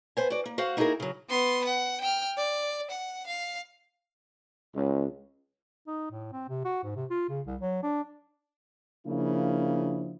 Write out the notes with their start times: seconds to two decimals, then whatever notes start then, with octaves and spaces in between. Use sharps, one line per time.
0.17 B3 C5 G#5
0.30 F#4 D5
0.46 A#3
0.58 F#4 C5 F5 F#5
0.77 A#3 D#4 E4 F#4 G#4 A#4
1.00 C#3 F#3
1.29 B3 C6
1.64 F#5
2.01 G5 F6
2.37 D5
2.91 F#5
3.27 F5
4.75 C#2
5.87 D#4
6.11 A2
6.32 C4
6.49 C3
6.65 F#4
6.83 G#2
6.96 C3
7.10 F4
7.29 C#3
7.47 C2
7.61 F#3
7.83 D4
9.07 C#3 F3 A#3 D4 E4